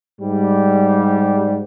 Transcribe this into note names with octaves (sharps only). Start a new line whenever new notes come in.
G#2 G3